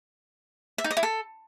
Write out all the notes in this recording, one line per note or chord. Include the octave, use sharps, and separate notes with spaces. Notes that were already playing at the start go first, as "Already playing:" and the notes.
E5
D#4
D#5
E4
A4